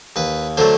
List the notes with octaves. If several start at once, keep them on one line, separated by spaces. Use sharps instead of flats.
D#2 B4
D3 F#3 A3 C5